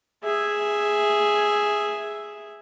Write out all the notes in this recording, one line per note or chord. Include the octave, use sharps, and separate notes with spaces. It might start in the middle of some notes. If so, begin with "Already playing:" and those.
G#4 E5